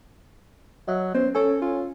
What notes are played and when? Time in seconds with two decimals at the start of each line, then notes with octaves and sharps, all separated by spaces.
0.88 F#3 D#5 E5
1.14 B3 C#4 C5
1.35 C#4 A4 C#5 G#5
1.62 F4